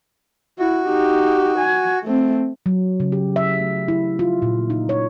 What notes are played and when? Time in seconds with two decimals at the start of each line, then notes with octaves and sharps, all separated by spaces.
0.59 E4 F#4
0.89 D#4 G4
1.59 G#5
2.04 A3 C4
2.66 F#3
3.00 C#3
3.12 G4
3.36 E5
3.60 A3
3.88 E4
4.19 F4
4.42 A#2
4.70 D#4
4.89 C#5